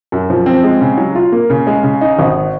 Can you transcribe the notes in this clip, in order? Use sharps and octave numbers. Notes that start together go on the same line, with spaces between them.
F#2
F3
C4
G#3
C#3
F#3
F4
A#3
C#3
G#3
C#3
D#4
G#1